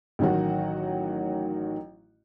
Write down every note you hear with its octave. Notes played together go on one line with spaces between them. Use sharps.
A1 D#3 F#3 F#4